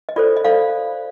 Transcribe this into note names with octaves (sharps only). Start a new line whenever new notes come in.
D#5
F4 A4 C5 D5
D#5
F4 A4 C5 D5 F5